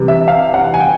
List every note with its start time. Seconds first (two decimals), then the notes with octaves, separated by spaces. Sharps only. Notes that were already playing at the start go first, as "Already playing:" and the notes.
Already playing: C3 E3 G3
0.08 E5
0.28 F5
0.54 F#5
0.74 G#5
0.80 G5